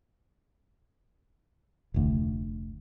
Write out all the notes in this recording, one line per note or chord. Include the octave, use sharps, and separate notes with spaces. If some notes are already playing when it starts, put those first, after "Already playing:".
F1 D2